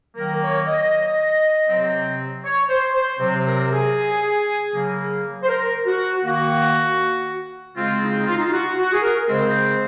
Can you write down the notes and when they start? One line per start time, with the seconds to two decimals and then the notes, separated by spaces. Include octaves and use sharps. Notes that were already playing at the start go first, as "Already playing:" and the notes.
0.15 D#3 F#3 A#3 A#4
0.41 C#5
0.66 D#5
1.67 C3 F#3 C4
2.44 C#5
2.69 C5
2.94 C5
3.20 C3 F#3 C4 C5
3.45 A#4
3.70 G#4
4.71 C#3 F#3 A#3
5.43 C5
5.48 A#4
5.86 F#4
6.24 D#3 A#3 F#4
7.75 C#3 G#3 C4 F4
8.02 D#4
8.09 F4
8.18 D#4
8.27 F4
8.37 D#4
8.45 F4
8.52 F#4
8.77 F#4
8.93 G#4
9.02 A#4
9.28 C#3 G#3 C4 C5